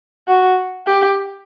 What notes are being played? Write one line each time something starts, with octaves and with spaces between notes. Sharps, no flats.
F#4
G4